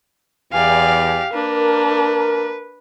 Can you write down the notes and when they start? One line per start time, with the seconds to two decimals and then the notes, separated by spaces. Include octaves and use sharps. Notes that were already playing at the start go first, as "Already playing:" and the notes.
0.53 E2 G4 D5 F5 G#5
1.34 A#3 D4 A#4 B4